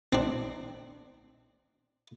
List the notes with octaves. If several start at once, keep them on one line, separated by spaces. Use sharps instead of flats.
C4 D4